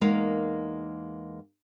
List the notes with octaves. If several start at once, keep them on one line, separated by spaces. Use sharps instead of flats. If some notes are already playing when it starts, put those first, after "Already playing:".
E2 G#3 A#3 D#4 A#4 F5